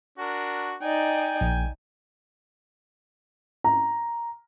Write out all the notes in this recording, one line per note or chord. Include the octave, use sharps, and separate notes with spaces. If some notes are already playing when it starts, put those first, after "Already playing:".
D4 F#4 A#4
D#4 D5 D#5 G5 G#5
A#1
A#5